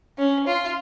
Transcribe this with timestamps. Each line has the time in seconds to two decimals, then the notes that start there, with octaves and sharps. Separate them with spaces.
0.18 C#4
0.47 F4